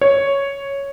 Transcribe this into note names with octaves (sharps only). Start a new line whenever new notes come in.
C#5